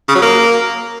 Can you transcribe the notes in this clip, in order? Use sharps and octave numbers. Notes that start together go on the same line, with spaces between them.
C#3
F#3
A#3